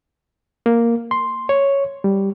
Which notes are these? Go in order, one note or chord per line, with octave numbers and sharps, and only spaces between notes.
A#3
C6
C#5
G3